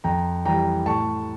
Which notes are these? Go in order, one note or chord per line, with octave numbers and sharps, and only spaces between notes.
F2 G5 A#5
E3 G3 G5 A#5
A2 A5 C#6